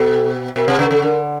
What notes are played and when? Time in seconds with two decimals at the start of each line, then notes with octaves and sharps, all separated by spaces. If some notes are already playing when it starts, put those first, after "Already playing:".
Already playing: B2 A4
0.56 B2 A#4
0.67 C3 B4
0.79 C#3 B4
0.86 A#4
0.91 C#3 A4
1.02 D3 A#4